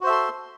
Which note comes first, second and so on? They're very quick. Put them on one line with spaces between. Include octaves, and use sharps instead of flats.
F#4 C5 E5 A4 C6